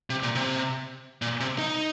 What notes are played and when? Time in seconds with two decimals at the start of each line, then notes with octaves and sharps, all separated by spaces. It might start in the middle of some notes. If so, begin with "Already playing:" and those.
0.10 C3
0.23 A#2
0.35 C3
1.22 A#2
1.40 C3
1.59 D#4